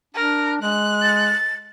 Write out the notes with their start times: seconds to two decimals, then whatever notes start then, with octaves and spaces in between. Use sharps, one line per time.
0.15 D4 A#4
0.62 G#3 F#6
1.02 A6